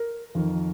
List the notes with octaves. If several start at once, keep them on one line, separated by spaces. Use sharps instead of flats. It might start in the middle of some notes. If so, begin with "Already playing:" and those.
Already playing: A#4
F2 D#3